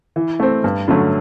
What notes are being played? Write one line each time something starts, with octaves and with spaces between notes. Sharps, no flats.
E3
A3 C4
G2
D3 F#3 A3 C#4